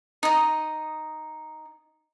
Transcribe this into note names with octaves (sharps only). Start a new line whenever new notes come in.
D#4 D#5